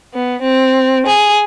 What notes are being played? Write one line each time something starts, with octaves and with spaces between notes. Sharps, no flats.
B3
C4
G#4